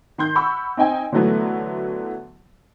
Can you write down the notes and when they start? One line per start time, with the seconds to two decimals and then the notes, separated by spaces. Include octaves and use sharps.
0.18 D#3 C6 G6
0.35 F#5 B5 C#6 E6
0.77 C4 D#4 D#5 G5 G#5
1.12 D3 E3 F#3 A3 B3 E4